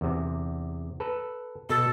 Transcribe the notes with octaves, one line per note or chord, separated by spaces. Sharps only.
E2 C3
A4 B4
B2 A4